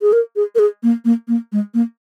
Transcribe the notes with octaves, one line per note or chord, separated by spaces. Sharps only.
G#4
A#4
G#4
A#4
G#4
A#3
A#3
A#3
G#3
A#3